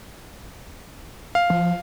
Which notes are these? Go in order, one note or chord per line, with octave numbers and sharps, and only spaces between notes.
F5
F3